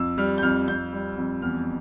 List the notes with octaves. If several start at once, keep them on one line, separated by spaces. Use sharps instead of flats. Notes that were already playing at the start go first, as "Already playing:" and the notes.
Already playing: F2 E6
G3 F6
G6
F2 F6
F2 G6
G3
F2
E2 F6